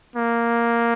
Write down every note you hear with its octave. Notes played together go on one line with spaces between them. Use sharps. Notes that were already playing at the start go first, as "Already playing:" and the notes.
A#3